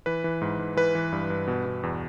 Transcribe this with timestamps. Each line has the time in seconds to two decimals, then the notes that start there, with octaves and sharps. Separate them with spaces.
0.06 E3 B4
0.24 E3
0.42 G#2
0.59 G#2
0.77 E3 B4
0.95 E3
1.12 G2
1.30 G2
1.47 B2
1.66 B2
1.83 E2